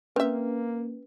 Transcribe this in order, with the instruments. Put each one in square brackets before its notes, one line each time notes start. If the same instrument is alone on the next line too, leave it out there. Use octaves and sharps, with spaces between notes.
[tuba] A#3 [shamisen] C4 E5 [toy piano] C#4 B4